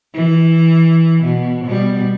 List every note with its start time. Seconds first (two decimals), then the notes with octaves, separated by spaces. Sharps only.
0.14 E3
1.24 B2
1.65 B2 G3